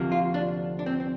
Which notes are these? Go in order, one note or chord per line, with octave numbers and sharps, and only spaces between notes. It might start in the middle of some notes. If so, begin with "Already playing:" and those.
Already playing: D2 C3 F3 A#3
F4
D4
D4
C4
C4